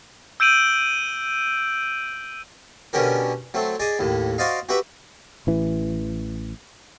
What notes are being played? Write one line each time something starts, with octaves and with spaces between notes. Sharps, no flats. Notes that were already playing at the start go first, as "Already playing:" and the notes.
E6 G6 D7 D#7 F#7
B2 D3 C#4 G4 A#4
F#3 A3 C4
G#4 D5 D#5
D#2 A2
F#4 C5 D5 D#5 F5
F#4 G4 B4 E5 B5
A1 E3